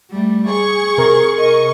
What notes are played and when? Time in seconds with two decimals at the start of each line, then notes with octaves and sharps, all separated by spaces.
0.11 G3 A3
0.49 G#4 C#6
0.98 C3 A#4
1.37 D#5 C#6